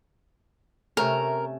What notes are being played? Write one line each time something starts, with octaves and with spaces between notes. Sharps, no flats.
C3 A3 C#4 A#4